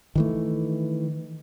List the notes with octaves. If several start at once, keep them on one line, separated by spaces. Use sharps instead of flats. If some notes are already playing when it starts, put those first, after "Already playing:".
D#3 E3 A3